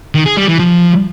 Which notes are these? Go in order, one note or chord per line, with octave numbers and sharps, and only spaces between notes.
D#3
G#4
G3
E3
F3